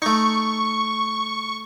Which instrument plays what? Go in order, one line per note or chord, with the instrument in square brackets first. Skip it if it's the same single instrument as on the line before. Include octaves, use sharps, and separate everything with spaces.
[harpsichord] A3 D#4 [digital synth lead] C#6